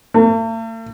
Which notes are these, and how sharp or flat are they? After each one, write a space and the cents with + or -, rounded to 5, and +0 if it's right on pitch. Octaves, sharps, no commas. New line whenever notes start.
A3 +45